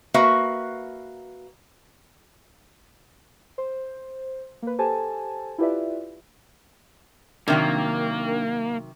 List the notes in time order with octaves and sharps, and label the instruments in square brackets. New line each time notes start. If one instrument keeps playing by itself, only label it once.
[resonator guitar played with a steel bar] A#3 F#4 B4 E5
[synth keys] C5
A#3 B4
G4 A4 C5 G#5 A5
E4 F4 G4 B4 D5 E5
[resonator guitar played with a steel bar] C3 D#3 F#3 [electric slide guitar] A#3 [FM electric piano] D4 A#4 G5